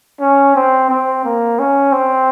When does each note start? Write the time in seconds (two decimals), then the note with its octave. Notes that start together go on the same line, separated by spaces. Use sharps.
0.21 C#4
0.56 C4
0.89 C4
1.25 A#3
1.59 C#4
1.92 C4